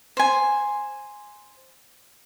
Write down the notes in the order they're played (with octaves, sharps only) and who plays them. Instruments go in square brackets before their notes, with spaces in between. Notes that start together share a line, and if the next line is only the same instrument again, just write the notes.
[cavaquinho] C5 G#5